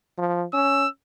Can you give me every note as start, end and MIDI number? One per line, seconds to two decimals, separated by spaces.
0.18 0.44 53
0.53 0.86 61
0.53 0.88 88